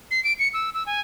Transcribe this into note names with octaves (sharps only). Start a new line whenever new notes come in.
C7
D7
C#7
E6
E6
G#5